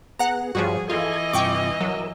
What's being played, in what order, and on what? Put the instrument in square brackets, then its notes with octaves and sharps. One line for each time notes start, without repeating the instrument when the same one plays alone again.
[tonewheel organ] B3 G#4 [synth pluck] F#5 A#5
[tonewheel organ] G2 F4 C#5 [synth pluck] F3 G3 F#4 [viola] G#4
[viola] E3 D#5 [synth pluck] F4 [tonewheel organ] A4 G#5 G#6
[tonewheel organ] G2 C3 F4 [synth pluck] G5 C#6 D6
[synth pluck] F#3 [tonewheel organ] A#4 E6